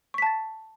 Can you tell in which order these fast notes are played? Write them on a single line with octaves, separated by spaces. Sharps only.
C#6 B6 A5 A6